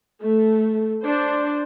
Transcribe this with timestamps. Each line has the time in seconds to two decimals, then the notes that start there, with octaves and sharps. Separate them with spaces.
0.22 A3
1.02 D4 C5